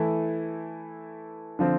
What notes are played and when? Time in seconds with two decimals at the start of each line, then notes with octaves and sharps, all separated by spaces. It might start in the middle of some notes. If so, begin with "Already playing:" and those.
Already playing: E3 A3 E4
1.59 D3 F3 C4